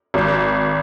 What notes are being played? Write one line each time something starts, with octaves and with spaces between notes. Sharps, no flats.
G#1